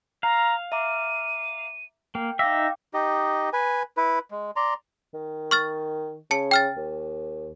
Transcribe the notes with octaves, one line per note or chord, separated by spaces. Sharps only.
F5 A#5
E5 A#5 D6 D#7
A#3 G5
D#4 E5 F5 G5 D6 A#6
D#4 G4 D#5
B4 G#5
E4 B4
G#3
D5 A#5 C6
D#3
C#6 F6 A6
C#3 A5 C#7
G5 F6 A6
D#2